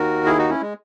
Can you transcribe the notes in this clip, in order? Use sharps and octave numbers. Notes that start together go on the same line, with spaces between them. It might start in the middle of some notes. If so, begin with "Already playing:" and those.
Already playing: D#2 D#3 F#4 A#4
E4 G#4
D#4 F#4
C#4 E4
G#3